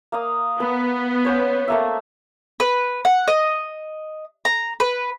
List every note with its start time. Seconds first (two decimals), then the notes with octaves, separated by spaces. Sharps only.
0.12 A#3 F5 D#6
0.60 B3 B4 B5
1.25 C#4 C5 C#5
1.68 A3 A#3 E5
2.60 B4
3.05 F#5
3.28 D#5
4.45 A#5
4.80 B4